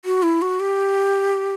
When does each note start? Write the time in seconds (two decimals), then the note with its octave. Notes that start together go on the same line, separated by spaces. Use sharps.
0.05 F#4
0.23 E4
0.42 F#4
0.60 G4